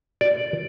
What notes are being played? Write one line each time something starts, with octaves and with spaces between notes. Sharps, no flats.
D5